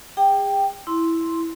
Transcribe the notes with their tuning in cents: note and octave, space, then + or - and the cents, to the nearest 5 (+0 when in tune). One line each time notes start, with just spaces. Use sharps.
G#4 -40 G5 +0 D6 +35
E4 +0 C6 +0